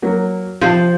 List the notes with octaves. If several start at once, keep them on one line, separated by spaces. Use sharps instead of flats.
F#3 A#3
C3 F3 C5 A5